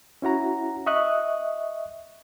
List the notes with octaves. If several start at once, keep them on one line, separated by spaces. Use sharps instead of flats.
C#4 E4 F#4 A#5
D#5 E5 C#6 D#6 F#6